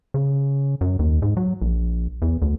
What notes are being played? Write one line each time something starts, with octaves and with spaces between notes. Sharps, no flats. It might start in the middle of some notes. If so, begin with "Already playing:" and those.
C#3
F#2
D#2
G#2
F#3
A#1
E2
D2